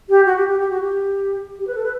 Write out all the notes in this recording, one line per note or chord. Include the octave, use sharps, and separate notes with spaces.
G4
F#4
G4
G4
G4
F#4
G4
G4
B4
A4
B4